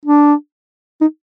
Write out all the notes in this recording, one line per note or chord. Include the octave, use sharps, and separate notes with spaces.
D4
D#4